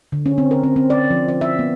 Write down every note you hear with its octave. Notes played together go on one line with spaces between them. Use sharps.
D3
C#4
C4
A#4
C4
C4
D5
F3
D5
E5
B3